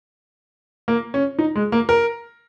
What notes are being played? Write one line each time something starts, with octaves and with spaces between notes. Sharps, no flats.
A#3
C#4
D#4
G#3
A#3
A#4